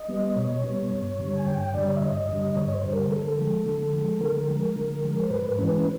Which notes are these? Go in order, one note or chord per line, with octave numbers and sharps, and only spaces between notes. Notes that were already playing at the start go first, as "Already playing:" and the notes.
Already playing: D#5
G3 B3
B2 C#5
G3 B3
G2
D3 G3
G#5
G2 G5
G5
D3 G3 D5
C#5
E5
G2 D#5
D3 G3
G2 C#5
C#5
C5
D3 G3
A#4
D3 A4
F3 G#3
D3
F3 G#3
D3 A#4
F3 G#3
D3
F3 G#3
C5
G#2 B4
B4
E3 G#3 C#4
B4